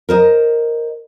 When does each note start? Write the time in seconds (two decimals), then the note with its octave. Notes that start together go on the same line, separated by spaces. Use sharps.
0.09 A#4 C5 D#5